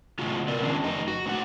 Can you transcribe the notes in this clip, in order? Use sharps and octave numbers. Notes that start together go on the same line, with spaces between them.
A2 C#3 F4 F#4
B3 A#4 D5
D#3 C#4 D4 F4
F2 D#4
F#4
A2 D#4 F#5